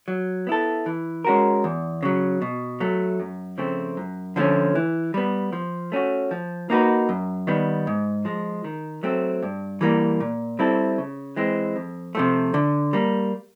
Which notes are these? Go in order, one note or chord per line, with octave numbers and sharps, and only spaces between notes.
F#3
B3 E4 A4
E3
G#3 C#4 F#4 A#4
E2
C#3 F#3
B2
F#3 A3
F#2
C#3 F3 A3 C4
F#2
D3 F3 A3 C#4
E3
G3 B3
F3
A3 C#4 F#4
F3
A#3 D#4 F#4 B4
F#2
D#3 G3 B3
G#2
F3 G#3
D#3
F#3 A3 C4
G2
E3 G3 A#3
A#2
G3 C4 E4 A4
C#3
E3 G#3 C4
F2
C3 F3 A3
D3
G3 A#3